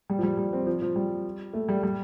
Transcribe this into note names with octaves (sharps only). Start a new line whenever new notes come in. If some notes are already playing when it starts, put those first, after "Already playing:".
G3
F3
G3
G3
C4
F3
F3
G3
A3
G3
G3